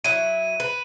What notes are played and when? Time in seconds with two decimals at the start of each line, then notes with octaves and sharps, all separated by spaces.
0.04 F#3 E4 D#7
0.60 B4